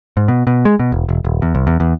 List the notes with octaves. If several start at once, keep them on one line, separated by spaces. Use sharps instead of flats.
G#2
B2
B2
G#3
B2
E1
E1
D#1
E2
C2
E2
E2